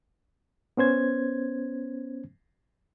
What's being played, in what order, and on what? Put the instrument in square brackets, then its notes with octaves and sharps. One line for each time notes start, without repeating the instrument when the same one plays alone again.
[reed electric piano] B3 C#4 C5 G#6